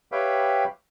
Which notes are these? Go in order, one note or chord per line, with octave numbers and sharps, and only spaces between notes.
G4 B4 C#5 E5 F5 G5